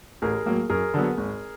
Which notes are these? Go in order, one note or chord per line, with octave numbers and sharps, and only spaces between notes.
A1 G#4 A#4
A2 F#3 A#3
F#2 G#4 A#4
D3 F#3 B3
G#1